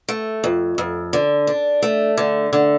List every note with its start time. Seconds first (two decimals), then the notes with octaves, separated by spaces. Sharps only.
0.09 A3
0.44 F2
0.78 F2
1.13 D3
1.47 D4
1.82 A3
2.17 D3
2.53 D3